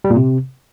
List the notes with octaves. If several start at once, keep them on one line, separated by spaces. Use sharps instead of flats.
G3
A#2
C3